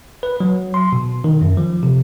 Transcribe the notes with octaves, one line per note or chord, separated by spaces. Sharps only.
B4
F#3
C6
B2
D#3
F#2
F3
C3